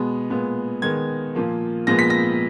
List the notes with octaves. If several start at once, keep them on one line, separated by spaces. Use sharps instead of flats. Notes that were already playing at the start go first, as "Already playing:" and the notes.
Already playing: B2 G#3 B3
A#2 G#3 B3
D#3 G#3 B3 G#6
A#2 F3 A#3
A#2 F3 G#3 B3 A#6
B6
A#6